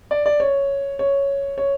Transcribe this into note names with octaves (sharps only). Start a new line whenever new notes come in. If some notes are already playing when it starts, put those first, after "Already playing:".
D5
D5
C#5
C#5
C#5